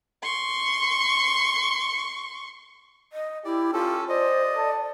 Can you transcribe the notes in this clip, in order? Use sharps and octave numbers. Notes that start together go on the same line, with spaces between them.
C6 C#6
D#5
E4 G4 D5
C#4 F4 G4 A4
C5 D5 D#5
A4